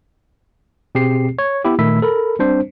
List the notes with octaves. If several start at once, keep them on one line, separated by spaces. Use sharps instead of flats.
B2 C4 G4 G#4 C7
C#5
B3 E4 G4
A#2 D#3 A3 B5 E6 B6
A4 A#4 B5
G3 C4 D4 C5